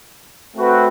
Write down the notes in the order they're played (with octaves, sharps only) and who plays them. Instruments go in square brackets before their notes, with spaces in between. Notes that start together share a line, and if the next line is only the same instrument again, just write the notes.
[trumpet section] A3 C4 F#4 B4